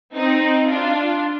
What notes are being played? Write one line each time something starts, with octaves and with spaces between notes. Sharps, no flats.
C4 D#4
D4 F4